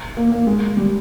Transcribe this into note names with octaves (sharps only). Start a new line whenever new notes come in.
A#3
A#3
G#3
G3